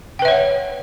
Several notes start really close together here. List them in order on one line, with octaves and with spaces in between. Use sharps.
G5 B4 E5 C#5 F#5